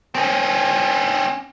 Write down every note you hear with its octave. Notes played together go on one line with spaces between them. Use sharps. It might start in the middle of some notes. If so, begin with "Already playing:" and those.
C4 C#4